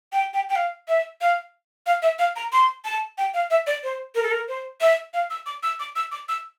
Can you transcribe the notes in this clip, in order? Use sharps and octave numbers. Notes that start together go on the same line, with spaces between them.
G5
G5
G5
F5
E5
F5
F5
E5
F5
A#5
C6
A5
G5
F5
E5
D5
C5
A#4
A4
A#4
C5
E5
F5
E6
D6
E6
D6
E6
D6
E6